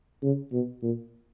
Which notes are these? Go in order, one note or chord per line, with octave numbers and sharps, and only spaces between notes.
C#3
B2
A#2